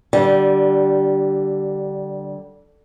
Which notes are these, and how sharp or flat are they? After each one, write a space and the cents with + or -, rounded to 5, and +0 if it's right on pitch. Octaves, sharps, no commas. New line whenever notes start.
D3 +0 G3 -20